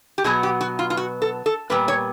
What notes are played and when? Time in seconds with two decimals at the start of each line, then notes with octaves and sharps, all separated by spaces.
0.18 G4
0.24 B2 F#3 B3 G#4
0.43 G4
0.61 F#4
0.79 F4
0.90 F4
0.97 F#4
1.22 A4
1.46 A4
1.70 A#2 G3 B3 B4
1.88 C#5